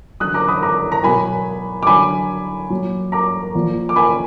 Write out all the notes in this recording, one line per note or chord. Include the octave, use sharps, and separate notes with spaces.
D3 F#3 D#6 F#6
A#5 D6
B5 D#6
A#5 D6
A#5
B2 F#3 G#5 B5
D6
D3 F#3 G#5 B5
A#2 F#3
A#5 D6
A#2 F3
D6
G#5 B5